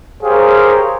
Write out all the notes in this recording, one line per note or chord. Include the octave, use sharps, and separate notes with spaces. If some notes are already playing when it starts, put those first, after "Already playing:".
G4 G#4 A#4 C5 C#5 F5